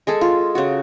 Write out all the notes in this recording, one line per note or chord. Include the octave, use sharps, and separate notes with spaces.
G#3 G#4 A4
F4
C#3 F#4